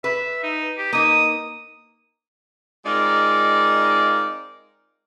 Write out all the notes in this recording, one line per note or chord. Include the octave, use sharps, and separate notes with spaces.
B4 E5
D#4
G4
A#3 D#4 D#6
G#3 C4 D#4 F4 A#4 D5